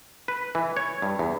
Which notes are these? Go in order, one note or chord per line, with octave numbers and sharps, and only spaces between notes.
B4
E3
C#5
G2
E2